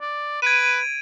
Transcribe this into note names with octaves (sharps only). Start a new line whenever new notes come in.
D5
B4 G#6 D7 D#7